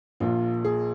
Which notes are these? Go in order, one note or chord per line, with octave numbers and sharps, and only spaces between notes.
A#1 A#2 F3 F4
G#4